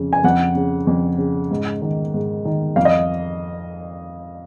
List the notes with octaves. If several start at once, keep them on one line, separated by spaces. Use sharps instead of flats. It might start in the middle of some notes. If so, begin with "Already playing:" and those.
Already playing: F2 C#3
G#5
F2 F#5
C#3
F2
C#3
G#2
D#3
G#2
D#3
F2 F5
D#5